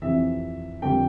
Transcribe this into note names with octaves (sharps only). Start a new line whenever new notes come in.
F2 C3 E3 E5
F2 D3 G3 G5